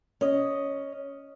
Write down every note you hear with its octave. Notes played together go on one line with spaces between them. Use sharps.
C#4 D#5